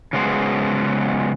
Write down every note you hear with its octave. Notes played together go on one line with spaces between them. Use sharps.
C#3 F#3 G#3 B3 C5